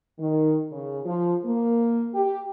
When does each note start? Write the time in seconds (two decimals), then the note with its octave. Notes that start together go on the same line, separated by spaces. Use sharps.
0.19 D#3
0.72 C#3
1.05 F3
1.45 A#3
2.14 G4